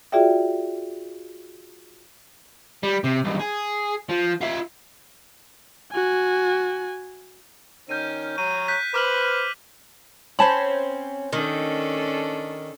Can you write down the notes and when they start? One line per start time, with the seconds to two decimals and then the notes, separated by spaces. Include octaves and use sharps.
0.12 F4 F#4 G#4 D5 E5 G5
2.83 G3
3.04 C3
3.24 B1 G2
3.39 G#4
4.09 F3
4.41 F4 E5
5.93 F#4 G#5
7.89 D#3 C#4 F6 G6 D#7
8.38 C#5 A#5 C#6 D#7
8.68 F#6 G6 B6
8.94 B4 C5 D6 F6 F#7
10.39 C4 C#4 C5 A5 B5
11.33 D#3 C#4 D4 A4